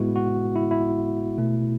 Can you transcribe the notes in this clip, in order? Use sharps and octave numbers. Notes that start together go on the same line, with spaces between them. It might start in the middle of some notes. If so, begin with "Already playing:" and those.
Already playing: A2 G#3 B3 E4 F#4
F#4
E4
E4
B2 A3